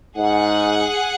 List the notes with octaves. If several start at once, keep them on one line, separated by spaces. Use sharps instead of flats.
G#2 G#4 F#5